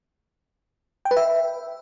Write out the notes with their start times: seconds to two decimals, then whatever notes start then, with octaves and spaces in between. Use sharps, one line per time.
1.05 G5
1.11 B4
1.17 E5